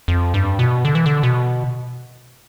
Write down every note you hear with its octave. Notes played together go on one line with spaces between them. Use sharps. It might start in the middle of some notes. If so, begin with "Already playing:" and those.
F2
G2
B2
D3
E3
D3
B2